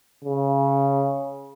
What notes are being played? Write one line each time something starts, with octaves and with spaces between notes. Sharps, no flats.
C#3